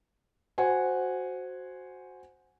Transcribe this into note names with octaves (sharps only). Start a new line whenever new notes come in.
F#4 C5 F#5 G#5